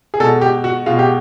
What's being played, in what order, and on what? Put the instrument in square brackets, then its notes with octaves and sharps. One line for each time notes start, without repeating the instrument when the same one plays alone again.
[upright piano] G#4
B2 G#3 A4
G4
F#4
B2 G#3 F4
G4